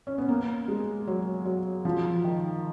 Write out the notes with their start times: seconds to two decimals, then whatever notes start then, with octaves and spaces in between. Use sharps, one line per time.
0.07 C#4
0.18 B3
0.29 A#3
0.68 G#3
1.07 F#3
1.45 F#3
1.85 F3
2.24 D#3